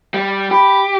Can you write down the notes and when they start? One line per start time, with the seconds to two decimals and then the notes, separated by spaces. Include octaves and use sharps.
0.14 G3
0.51 G4 B5